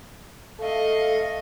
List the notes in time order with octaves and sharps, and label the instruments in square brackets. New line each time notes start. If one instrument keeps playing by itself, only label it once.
[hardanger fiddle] A3 D#5 [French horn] A4 [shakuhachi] F5